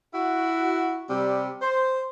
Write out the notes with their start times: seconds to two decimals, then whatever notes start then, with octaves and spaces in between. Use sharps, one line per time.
0.14 E4 F#4
1.10 C3 G3
1.62 C5